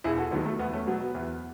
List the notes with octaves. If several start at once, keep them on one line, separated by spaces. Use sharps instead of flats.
E1 E4 G#4
F#4 A4
D#2 D#3 F#3 B3
A3
E2 B3
A3 C#4
B2 F#3 B3
B3
E2